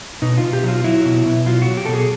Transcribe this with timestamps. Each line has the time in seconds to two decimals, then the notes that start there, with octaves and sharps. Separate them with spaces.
0.22 B2 D#4
0.38 F4
0.43 B2
0.53 G4
0.64 F#3 F4
0.84 F#3 E4
1.05 B2
1.26 B2
1.46 F#3 F4
1.62 F#4
1.67 F#3
1.77 G4
1.85 A4
1.88 B2 G#4